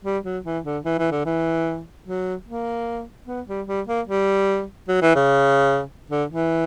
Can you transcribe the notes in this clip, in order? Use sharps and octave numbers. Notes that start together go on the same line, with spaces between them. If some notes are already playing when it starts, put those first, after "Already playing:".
G3
F#3
E3
D3
E3
E3
D3
E3
F#3
A#3
B3
G3
G3
A#3
G3
F#3
E3
C#3
D3
E3